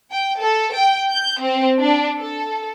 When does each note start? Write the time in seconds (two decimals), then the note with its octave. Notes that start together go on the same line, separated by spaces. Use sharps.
0.11 G5
0.40 A4
0.73 G5
1.10 G6
1.40 C4
1.80 D4
2.18 A4